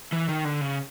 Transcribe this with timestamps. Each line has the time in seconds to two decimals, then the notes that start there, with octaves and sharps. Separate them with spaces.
0.12 E3
0.29 D#3
0.44 D3
0.61 C#3